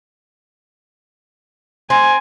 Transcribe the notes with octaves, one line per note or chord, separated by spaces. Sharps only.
C4 G#5